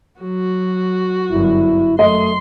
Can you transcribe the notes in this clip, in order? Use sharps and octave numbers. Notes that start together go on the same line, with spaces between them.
F#3 F#4
G1 F#2 E4
F#2 A3 D#5 C6